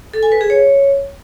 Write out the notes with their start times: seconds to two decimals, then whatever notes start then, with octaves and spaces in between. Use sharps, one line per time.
0.14 A4
0.23 G#5
0.32 B4
0.41 G#4
0.50 C#5